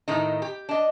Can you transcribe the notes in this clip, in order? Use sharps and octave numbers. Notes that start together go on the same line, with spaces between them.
A2 D#3 D#4
G4
D4 D#5